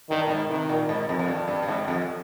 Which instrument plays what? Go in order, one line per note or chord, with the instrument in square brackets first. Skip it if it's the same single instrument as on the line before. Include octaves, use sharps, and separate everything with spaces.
[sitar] G2 [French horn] D#3
[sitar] A#2
G#2
[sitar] C3 [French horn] D#3
[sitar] A#2
G#2
F2
F2
G2
G2
G2
G#2
F2